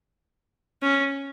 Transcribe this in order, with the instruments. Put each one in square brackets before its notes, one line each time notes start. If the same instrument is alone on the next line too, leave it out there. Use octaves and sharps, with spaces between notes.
[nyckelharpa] C#4